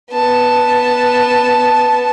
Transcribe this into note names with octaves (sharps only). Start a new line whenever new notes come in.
B3 A5